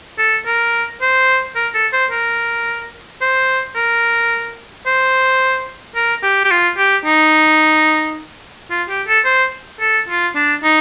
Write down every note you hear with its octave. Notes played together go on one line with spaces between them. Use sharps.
A4
A#4
C5
A#4
A4
C5
A#4
C5
A#4
C5
A#4
G4
G4
F4
G4
D#4
F4
G4
A4
C5
A4
F4
D4
D#4